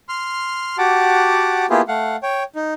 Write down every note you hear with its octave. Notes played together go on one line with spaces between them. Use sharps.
C6 F6
F#4 G4 F#5 A5 D6
A#3 B3 E4 F4 G4 G#4
A3 F5 F#5
C#5 G5
D#4